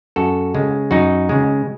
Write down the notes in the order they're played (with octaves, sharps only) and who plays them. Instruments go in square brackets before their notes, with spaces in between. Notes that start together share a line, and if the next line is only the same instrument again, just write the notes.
[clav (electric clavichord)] F#2 F#4 A4
C#3 G#3
F#2 D#4 F#4
C#3 G#3